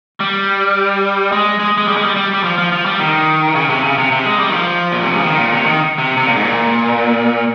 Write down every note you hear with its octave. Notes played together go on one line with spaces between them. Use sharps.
G3
G#3
G#3
G#3
G3
G#3
G3
G3
G3
F3
F3
F3
G3
D#3
C#3
C3
C#3
C3
C3
G#3
G3
D#3
F3
A#2
C3
C#3
D#3
A#2
C3
D#3
C3
C3
A#2
G#2
A#2